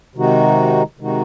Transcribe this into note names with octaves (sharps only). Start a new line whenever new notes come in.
C3 D#3 G#3 D#4 F#4
C3 D#3 G#3 D#4 F#4